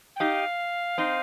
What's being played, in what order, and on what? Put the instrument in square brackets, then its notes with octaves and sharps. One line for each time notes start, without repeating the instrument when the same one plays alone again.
[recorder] G5
[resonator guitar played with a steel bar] D#4 G4 [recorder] F5
[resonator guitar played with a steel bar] C4 D#4